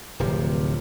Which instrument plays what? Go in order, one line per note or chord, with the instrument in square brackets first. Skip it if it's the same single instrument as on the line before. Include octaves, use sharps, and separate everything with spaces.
[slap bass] D1 C3 F3